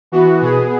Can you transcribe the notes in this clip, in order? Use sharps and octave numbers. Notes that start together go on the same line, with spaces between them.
E3 B3 F#4
B2 B3 G#4